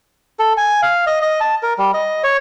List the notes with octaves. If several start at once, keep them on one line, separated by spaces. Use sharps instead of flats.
A4
G#5
F5
D#5
D#5
A5
A#4
G3
D#5
C#5